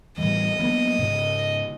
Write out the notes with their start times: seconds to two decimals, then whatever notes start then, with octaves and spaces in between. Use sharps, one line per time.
0.18 A2 E3 G3 D#5
0.59 F#3 A#3 B3
0.99 G#2 C#3